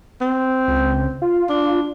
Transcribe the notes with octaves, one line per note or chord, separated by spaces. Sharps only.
C4
C#2
F4
D4